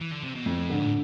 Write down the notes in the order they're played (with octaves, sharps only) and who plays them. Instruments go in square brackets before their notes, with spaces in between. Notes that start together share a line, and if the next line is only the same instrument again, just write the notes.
[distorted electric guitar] E3
D3
C3
B2
[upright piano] F2 [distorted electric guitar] A2
[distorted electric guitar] G#2 [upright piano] D3
[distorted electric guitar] A2